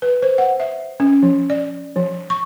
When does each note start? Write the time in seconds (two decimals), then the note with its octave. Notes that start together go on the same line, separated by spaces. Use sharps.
0.02 B4
0.22 C5
0.38 F#5
0.60 E5
1.00 C#4
1.23 F3
1.50 D5
1.96 F3
2.30 C#6